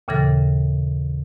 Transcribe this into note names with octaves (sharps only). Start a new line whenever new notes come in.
D#2 A#2 C#3 E3 A4 A#6